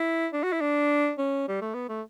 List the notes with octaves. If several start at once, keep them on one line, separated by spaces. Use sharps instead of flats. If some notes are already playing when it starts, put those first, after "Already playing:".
Already playing: E4
D4
F#4
E4
D4
C#4
G3
A3
B3
A3